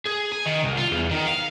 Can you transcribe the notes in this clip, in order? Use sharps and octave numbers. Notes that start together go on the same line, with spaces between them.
G#4
G#5
D#3
C2
F4
E2
D#3
F5